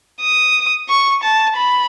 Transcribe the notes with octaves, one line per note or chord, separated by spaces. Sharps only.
D#6
C#6
A5
B5